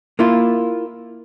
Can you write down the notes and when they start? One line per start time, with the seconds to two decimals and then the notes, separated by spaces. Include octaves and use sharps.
0.19 A#3 E4 F4